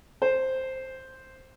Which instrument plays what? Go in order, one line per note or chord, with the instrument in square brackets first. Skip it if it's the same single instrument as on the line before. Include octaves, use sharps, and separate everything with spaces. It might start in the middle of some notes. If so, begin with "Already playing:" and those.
[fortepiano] C5